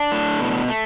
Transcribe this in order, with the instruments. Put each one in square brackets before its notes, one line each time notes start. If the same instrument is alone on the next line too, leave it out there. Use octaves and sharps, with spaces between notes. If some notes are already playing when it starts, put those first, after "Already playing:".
Already playing: [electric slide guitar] D4
A2
B2
A3